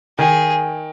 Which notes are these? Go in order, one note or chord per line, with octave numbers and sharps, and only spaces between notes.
D#3 G#4